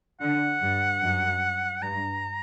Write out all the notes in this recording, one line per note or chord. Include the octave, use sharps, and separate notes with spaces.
D3 F#5
G2
F#2
G2 A#5